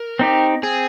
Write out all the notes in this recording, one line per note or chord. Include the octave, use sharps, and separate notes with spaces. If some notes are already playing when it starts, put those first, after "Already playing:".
Already playing: A#4
C4 D#4 G4
C4 G#4